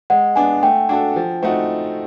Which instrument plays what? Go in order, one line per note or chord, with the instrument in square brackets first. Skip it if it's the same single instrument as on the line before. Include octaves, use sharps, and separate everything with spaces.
[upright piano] G#3 [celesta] F#5
[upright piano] B3 D4 [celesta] G#5
[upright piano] A3 [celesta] G5
[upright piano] D4 F#4 A4
F3
A3 C4 D#4 F#4